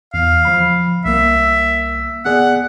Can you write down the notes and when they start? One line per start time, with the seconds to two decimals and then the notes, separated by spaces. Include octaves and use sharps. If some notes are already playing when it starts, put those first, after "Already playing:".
0.14 E2 F5
0.45 F3 B5
1.05 C2 A#3 E5
2.25 B3 G#4 D5 F#5